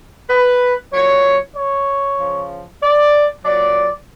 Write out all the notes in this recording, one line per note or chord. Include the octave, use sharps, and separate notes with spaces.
B4
A#2 F#3 C#5
C#5
C#3 F3
D5
A#2 F#3 D5